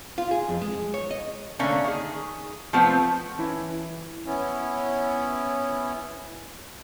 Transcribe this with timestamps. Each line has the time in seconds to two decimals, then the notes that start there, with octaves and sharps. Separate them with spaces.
0.18 F4
0.31 G#4
0.49 F2
0.61 G#3
0.94 C#5
1.11 D#5
1.59 D3 A3 A#3 C#4
1.84 D#3 G#4
2.73 F3 A3 B3 C4
3.39 E3 C#4 E4
4.26 B3 C#4 E4